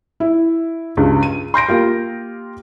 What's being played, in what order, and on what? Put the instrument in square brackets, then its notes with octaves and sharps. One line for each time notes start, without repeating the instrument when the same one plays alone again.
[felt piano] E4
C#2 G2
D#7
C6 G6 A#6 D7
A#3 F4 G4